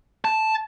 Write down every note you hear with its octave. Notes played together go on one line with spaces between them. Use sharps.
A5